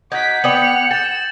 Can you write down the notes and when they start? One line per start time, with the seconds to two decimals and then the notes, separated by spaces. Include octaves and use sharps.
0.12 D#4 F#4 F#5 D6 G#6 B6
0.44 B3 D5 G5 C#7 F7 F#7
0.91 G5 A6 E7